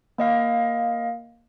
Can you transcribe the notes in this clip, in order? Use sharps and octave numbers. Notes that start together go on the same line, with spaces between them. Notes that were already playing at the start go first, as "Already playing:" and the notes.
A#3 D#5 F5